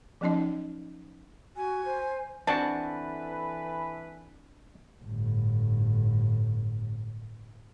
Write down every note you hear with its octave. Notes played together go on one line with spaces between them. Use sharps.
F3 F#3 B3 C#4 D#4 D#5
F#4 G#5
C5
E3 C4 D4 E4 F#4 A4 B4 A5
G1 A2